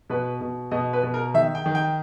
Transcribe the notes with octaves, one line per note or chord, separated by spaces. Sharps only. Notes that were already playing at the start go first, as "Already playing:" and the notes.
B2 B4
B2
B2 D#5
B4
B2
A#4
D#3 E5
G5
D#3
G5